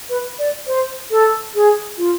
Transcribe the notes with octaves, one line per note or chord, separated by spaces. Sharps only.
B4
D5
C5
A4
G#4
F4